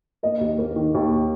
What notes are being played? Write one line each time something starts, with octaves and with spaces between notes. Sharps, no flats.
A#3 D#5
D#2
A#3
D#3
D#2